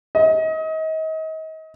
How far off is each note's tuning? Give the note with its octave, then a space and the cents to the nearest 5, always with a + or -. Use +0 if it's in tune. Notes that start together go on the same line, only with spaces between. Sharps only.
D#5 +35